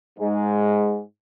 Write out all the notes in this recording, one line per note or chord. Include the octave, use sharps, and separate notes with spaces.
G#2 G#3